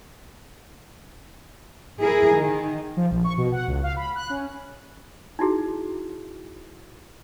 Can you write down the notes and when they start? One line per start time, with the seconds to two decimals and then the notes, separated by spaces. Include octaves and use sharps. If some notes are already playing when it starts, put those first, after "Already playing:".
2.00 E4 G#4 A#4
2.34 D#3
2.97 F3
3.11 A#1
3.24 C#6
3.38 B2
3.52 F#5
3.67 C#2
3.83 F5
3.96 B5
4.16 F#6
4.30 C#4
5.39 D#4 E4 F#4 G#4